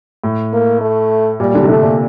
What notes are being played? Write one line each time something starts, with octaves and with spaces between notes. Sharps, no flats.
A2
A#3
A3
A#2 G3
D3
C3
D3 A3
A#2